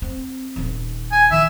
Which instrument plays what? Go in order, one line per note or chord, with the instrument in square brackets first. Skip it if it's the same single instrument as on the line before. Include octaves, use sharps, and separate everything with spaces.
[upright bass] C4
D#1 D3
[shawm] G#5
[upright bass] D#3 [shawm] E5